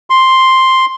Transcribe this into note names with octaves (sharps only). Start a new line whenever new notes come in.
C6